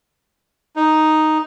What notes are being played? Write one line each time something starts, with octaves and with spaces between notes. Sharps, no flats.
D#4